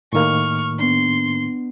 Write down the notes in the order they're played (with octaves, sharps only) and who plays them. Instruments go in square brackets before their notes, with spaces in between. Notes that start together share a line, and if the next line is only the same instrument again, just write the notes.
[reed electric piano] A2 D#3 A#3 [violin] C#6 F6
[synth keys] B3 D4 [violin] C6